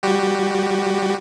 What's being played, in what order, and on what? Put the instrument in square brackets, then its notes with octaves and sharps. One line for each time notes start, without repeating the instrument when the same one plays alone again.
[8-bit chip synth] G3 F#4 G4